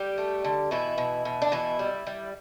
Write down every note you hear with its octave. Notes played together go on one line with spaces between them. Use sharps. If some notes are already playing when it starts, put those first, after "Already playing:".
Already playing: G3 G4
A3
D3
B2 E3 E4
B2
B2
D4
B2 E3 E4
G3
G3